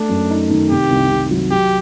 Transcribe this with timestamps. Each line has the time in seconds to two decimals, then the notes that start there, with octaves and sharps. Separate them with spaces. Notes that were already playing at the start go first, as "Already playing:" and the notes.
Already playing: A3 D4
0.09 F#2
0.30 D#4
0.50 D#3
0.70 C3 G4
0.91 C2
1.10 C2
1.31 F#3
1.51 F#3 G4